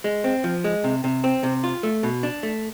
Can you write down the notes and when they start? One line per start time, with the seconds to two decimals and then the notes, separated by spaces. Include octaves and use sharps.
0.04 G#3
0.24 C4
0.44 F3
0.64 G#3
0.84 C3
1.04 C3
1.24 C4
1.43 C3
1.64 F4
1.83 A3
2.03 B2
2.23 D4
2.43 A3